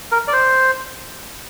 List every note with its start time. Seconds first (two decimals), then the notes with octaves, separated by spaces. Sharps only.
0.12 A#4
0.28 D5
0.33 C5